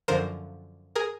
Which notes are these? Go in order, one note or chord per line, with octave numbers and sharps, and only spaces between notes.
F#2 D3 F3 A#4 C5
G#4 A#4